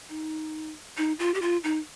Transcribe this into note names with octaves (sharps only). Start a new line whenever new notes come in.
D#4
D#4
F4
G4
F4
D#4